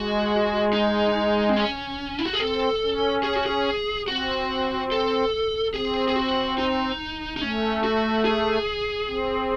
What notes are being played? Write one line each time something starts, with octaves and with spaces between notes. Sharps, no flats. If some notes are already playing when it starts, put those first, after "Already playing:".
Already playing: G#3 F#4
D#4
C4
C#4
E4
F#4
G#4
C4 A4
C#4
G#4
F#4
G#4
C4 F#4
A4
C4 G#4
G#4
F#4
D#4
D#4
A3 C#4
F#4
G#4
C4